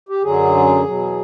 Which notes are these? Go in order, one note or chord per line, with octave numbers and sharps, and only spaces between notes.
G4
F#2 D3 F#3 G#4
E2 B2 F#3